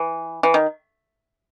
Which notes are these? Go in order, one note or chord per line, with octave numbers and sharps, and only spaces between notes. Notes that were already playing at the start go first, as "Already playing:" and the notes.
Already playing: E3
E3
D#3